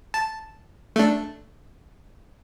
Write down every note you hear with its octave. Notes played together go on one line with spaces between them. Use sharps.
A5
A3 D4